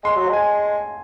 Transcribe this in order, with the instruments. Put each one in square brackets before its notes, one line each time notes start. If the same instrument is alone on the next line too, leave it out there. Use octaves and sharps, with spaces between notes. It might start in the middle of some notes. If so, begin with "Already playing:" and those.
[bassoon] G#3 [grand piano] C6
[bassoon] F#3
[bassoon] G#3 [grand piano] G#5